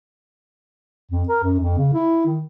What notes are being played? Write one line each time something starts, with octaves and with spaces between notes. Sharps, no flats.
F2
A#4
F#2
F2
C#3
E4
D#3